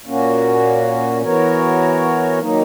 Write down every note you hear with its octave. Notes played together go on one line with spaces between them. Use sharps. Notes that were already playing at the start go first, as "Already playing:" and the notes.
A#2 A#3 C#4 F#4
E3 B3 F#4 A#4 C#5
D#3 F#3 A#3 D#4